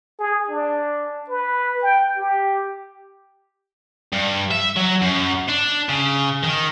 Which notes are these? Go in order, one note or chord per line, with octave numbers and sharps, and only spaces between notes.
G#4
D4
B4
G5
G4
G2
E5
F#3
F#2
D4
C#3
D#3